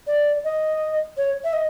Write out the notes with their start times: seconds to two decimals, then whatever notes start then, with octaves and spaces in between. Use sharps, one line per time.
0.07 D5
0.45 D#5
1.17 C#5
1.44 E5
1.53 D#5